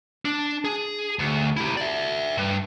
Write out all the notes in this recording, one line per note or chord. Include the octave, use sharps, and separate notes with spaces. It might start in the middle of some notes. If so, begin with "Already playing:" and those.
D4
G#4
D2
E4 G4
D5 E5
G2